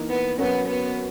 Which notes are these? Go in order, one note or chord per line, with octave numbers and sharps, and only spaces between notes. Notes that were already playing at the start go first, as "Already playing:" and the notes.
Already playing: E3 A#3 D#4
B3
F#3 B3 C#4 F#4 A#4
B3